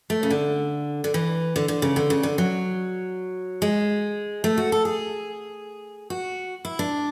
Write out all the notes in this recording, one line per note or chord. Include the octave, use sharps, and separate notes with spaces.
A3
C#3
D3
D3
E3
D3
D3
C#3
D3
C#3
D3
F#3
G#3
A3
F#4
A4
G#4
F#4
E4
D4